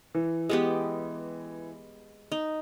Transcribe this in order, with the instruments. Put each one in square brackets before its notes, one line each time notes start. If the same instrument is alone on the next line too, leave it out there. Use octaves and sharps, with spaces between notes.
[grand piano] E3
[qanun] G#3 B3 G4
D#4